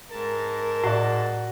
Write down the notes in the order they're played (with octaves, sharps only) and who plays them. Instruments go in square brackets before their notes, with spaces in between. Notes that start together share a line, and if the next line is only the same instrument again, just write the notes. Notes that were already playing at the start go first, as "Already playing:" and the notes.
[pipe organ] G#2 A5 [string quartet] A#4
[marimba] A2 [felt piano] F#4 D5